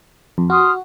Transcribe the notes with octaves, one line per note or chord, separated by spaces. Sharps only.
F2
F#4 C6 D#6 F6